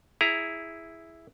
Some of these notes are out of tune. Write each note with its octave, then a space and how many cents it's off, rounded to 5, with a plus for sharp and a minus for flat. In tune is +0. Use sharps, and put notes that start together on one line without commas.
E4 +0 G#4 +0 A#5 +0